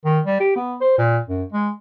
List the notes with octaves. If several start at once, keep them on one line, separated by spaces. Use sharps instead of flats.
D#3
G3
G4
B3
C5
A#2
F#2
G#3